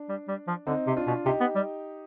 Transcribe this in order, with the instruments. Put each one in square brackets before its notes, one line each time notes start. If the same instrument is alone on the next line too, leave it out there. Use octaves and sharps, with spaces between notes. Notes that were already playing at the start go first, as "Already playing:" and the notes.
Already playing: [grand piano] D4
[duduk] G3
G3
F3
[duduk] D3 [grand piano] C4 D#4
[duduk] C3
[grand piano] D4 F4
[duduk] B2
[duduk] C3 [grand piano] D#4 G4
[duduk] B3
G3